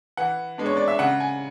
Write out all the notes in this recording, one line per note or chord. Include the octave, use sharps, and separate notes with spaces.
E3 F#5
G#3 B3 D4
C#5
D5
E5
C#3 F#5
G#5